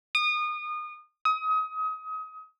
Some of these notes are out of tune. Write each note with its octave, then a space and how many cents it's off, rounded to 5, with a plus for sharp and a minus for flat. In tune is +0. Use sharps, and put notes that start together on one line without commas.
D#6 -30
D#6 +30